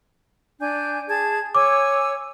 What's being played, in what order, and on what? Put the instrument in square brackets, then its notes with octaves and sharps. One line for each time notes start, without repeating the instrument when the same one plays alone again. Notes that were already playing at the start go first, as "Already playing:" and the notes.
[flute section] D4 G#5 G6
G#4 A5 G#6
[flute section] C#5 G#5 E6 [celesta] D6